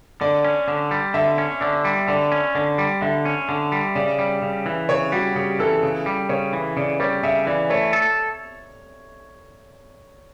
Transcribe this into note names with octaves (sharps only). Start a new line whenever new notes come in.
D3 D5
C#4
D3
G3
D3 E5
C#4
D3 D5
G3
D3 D5
C#4
D3 D5
G3
D3 E5
C#4
D3
G3
C#3 D5
G3
C#3
E3
C#3 C#5
G3 F#4
C#3 G4
E3 A4
C#3
G3
C#3 C#5
E3
C#3 D5
G3 C#5
C#3 E5
E3 D5
A3 C#5
A4